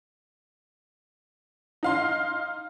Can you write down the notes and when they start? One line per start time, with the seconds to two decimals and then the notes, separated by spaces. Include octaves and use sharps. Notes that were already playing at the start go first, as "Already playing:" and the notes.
1.83 D#4 F5 C6